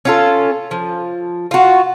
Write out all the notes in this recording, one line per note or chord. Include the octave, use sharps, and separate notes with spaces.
C#4 F4 A4
F3
F4 F#4